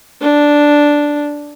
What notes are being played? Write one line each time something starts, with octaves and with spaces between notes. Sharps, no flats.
D4